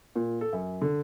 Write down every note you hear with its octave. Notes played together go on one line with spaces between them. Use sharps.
A#2
A4
F#2
D3